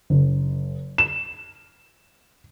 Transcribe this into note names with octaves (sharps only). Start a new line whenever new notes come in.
F#1
E7